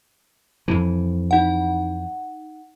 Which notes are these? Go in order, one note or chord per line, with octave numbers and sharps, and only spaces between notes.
F2 E3
D#4 F#5